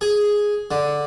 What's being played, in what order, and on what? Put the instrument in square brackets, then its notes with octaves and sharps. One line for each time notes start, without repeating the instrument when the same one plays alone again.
[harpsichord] G#4
D3